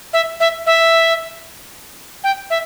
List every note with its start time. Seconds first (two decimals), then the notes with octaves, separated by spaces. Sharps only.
0.13 E5
0.40 E5
0.66 E5
2.24 G5
2.50 E5